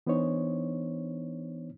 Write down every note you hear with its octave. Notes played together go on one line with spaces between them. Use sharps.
E3 B3 D4 D#4 C5 C#5